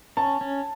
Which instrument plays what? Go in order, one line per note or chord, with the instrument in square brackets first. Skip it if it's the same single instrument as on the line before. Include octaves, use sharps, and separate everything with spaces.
[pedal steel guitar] C#4 [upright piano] A5
[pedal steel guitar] C#4